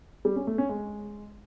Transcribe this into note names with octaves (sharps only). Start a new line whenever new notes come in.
G3
C#4
A3
C#4
G#3